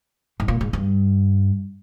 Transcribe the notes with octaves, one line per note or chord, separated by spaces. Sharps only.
G#2
A#2
G#2
G2